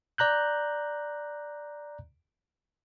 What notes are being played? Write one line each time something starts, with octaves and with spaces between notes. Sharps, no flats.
D5 A#5 F#6 G6